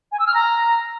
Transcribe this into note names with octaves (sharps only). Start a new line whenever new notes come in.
G#5
E6
F6
A#5